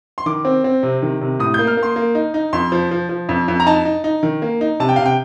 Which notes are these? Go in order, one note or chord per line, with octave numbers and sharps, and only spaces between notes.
C6
D#3 D6
C4
C4
C3
D#3
C3
A2 D#6
G6
A#3
F6
A#3
C6
A#3
D#4
D#4
F2 C6
F3
F3
F3
F2
F2
A#5
D#4 A5
D#4
D#4
D#3
A#3
D#4
C3 A5
G5
C3 F5
G5